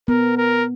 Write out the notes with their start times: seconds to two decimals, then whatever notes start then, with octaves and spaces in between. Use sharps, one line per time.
0.08 B3 A#4
0.37 A#4